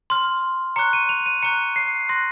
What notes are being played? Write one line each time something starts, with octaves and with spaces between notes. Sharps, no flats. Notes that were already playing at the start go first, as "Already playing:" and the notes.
C6 F6
A#5 C#6 F#6 C#7
D#7
F7
D#7
A#5 C#6 F#6 C#7
C7
C6 F#6 A#6